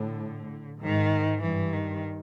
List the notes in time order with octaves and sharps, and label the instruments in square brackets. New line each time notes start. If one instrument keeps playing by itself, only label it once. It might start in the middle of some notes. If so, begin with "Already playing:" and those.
Already playing: [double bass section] A2 [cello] D3
[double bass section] G#2 [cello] D#3
[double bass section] G2 [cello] E3
[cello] D#3